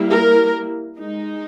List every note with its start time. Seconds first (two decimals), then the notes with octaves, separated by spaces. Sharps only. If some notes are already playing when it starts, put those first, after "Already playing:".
Already playing: G3 A#3 E4
0.12 A#4
0.98 G#3 D#4